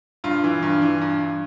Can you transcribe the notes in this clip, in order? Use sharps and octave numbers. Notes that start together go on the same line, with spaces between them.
G2 F4
E3
G2
E3
G2
G2